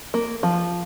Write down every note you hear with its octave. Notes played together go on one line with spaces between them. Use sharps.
A#3
F3